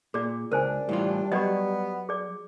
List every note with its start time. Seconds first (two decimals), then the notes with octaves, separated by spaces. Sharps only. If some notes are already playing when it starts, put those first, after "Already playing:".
0.14 A#2 G#4 D5
0.51 C#2 D4 A#4 C5 G#5
0.89 A2 E3 G3 F4
1.32 F#3 B3 G4 D5 D#5
2.09 G#4 D5